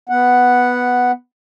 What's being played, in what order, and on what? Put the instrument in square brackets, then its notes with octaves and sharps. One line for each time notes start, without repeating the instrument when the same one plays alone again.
[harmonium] B3 F#5